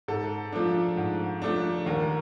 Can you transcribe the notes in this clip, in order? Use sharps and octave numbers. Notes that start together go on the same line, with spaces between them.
G#2 A4
F3 A3 D4
G#2
F3 A3 D4
D#2 A#4